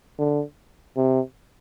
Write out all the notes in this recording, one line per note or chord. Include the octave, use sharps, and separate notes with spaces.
D3
C3